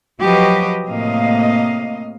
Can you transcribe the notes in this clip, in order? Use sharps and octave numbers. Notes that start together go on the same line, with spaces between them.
F3 F#3 F#4 G4 B4 D#5
A2 C3 A#3 D#5 F5